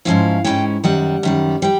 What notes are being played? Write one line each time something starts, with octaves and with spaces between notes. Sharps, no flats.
G#2 F3 G#3 C#4 E4 F5
G#2 F3 G#3 C#4 E4 G5
F#2 D#3 G3 F#5
F#2 D#3 G3
E3 G3 G5